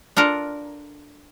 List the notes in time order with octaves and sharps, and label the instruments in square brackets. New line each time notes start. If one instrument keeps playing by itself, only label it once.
[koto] D4 F4 A4 A#4